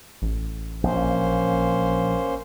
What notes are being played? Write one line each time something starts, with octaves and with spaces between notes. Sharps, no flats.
A1
A#1 A#3 C#4 C5